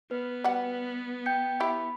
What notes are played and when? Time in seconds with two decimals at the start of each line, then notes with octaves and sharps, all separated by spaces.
0.11 B3 B4
0.44 G3 F#4 F#5
1.26 G5 G6 C#7
1.60 E4 G4 B5